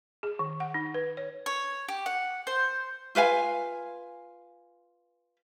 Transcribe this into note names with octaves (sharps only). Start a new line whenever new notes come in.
G#4
D#3
F#5
D#4
B4
C#5
C#5
G4
F#5
C5
F4 B4 F5 G#5